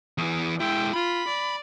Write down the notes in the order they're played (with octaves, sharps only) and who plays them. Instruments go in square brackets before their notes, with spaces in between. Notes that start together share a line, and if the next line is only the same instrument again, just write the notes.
[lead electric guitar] E2 E3
[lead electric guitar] G#3 E4 [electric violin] G5
[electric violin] F4 [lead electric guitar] B5
[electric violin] D5